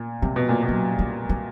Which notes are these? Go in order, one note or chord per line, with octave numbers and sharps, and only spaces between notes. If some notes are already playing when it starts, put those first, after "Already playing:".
Already playing: A#2
C3 G3
B2
A#2
B2
F#3
G3
G3